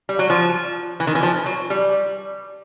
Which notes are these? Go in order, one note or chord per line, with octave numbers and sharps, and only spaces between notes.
G3
F#3
F3
E3
D#3
E3
F3
F#3
G3